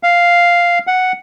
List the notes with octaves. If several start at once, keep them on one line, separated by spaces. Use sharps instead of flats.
F5
F#5